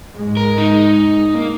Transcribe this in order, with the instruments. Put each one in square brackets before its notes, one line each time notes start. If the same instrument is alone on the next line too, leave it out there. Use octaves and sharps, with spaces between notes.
[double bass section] G#2 G#3
[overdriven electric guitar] A#4
D#4
A#3